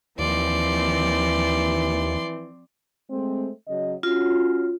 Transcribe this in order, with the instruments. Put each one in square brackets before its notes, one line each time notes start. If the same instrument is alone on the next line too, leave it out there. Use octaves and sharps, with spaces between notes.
[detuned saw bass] D#2 [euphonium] E3 [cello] F3 C4 [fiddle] D5 C6
[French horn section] G#3 A3 C4
C#3 F#3 D#5
[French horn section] C#4 F#4 [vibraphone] F4